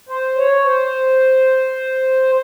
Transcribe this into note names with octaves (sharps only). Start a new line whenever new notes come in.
C5
C#5
C5